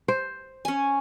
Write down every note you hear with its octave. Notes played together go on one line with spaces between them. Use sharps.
C5
C#4 G#5